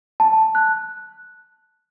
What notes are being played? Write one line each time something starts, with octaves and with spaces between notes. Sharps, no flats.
A5
F#6